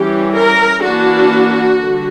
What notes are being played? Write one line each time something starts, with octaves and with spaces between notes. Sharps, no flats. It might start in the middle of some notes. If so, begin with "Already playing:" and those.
Already playing: E3 G3 C#4 G4
A#4
E3 A#3 D4 F#4
D3 G3